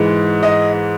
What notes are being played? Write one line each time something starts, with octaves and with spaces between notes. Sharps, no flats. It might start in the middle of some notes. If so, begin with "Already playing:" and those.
Already playing: G#2 E3 G#3
D#5